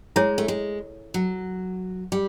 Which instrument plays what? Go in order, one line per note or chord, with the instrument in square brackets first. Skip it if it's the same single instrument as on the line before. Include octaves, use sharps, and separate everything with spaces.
[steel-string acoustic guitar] G#3 [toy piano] E4 G#4 C#5
[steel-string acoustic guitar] A3
G#3
F#3
G3